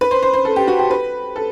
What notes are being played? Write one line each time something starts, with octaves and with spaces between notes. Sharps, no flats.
B4
C5
C5
C5
A4
G4
F#4
G4
B4
A4